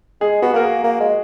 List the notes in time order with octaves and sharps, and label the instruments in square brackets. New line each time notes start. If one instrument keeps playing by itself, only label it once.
[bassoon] G#3 [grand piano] G#4
[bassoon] B3 [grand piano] F#4
[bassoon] A#3 [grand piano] A#4
[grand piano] G#4
[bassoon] A#3
G#3